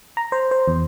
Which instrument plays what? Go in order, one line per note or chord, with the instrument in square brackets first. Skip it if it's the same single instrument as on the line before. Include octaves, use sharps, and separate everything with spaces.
[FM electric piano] A#5
C5
C5
E2